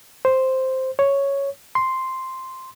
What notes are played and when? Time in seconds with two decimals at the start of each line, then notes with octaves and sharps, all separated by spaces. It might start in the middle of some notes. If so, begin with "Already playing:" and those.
0.25 C5
0.99 C#5
1.75 C6